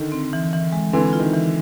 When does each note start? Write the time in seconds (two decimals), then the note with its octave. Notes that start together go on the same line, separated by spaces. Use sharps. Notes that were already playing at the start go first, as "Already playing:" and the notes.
Already playing: D3 D#3
0.12 C4
0.33 E3
0.53 E3
0.73 G#3
0.93 D3 E3 C4
1.13 F4
1.20 D#3
1.33 E3